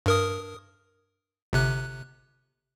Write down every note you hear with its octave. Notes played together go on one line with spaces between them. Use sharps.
G2 A#4 D#6
G1 C3 F#6